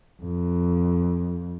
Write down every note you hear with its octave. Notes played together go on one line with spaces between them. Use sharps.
F2